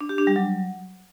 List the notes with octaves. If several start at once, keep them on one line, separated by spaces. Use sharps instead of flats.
D4
G4
D4
G3
F#3